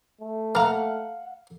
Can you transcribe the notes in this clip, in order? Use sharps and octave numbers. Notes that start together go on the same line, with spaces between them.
A3
A#3 F5 F#5 A#5 F6